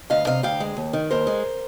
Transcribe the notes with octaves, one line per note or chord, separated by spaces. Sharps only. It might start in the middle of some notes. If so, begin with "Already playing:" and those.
D2 D#5 F5
C3 D#5 F5
D2 F5 G5
G#3
D#2
D#3
D#2 A#4 C5
G#3